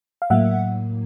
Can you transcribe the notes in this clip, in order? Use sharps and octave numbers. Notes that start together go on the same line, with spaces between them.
F5
A2 F#3 A#3 E5 F#5